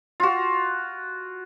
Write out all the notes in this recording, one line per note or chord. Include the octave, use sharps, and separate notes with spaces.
F4 F#4